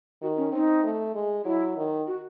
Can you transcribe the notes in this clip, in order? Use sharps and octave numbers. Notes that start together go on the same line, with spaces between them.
D#3 F#4
C#4
C4 D#4
A3
G#3
F#3 E4
D#3
F#4